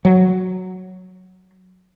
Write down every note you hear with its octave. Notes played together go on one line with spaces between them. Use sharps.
F#3